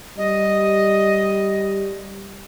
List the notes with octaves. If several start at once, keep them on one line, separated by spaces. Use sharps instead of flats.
G3 D#5